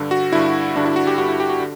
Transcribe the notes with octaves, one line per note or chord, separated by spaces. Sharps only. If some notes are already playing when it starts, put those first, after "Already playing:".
Already playing: G2 D3
F#4
G2 D3 E4
G2 D3 D4
E4
F#4
G4
G2 D3 F#4
E4
G4
F#4
D3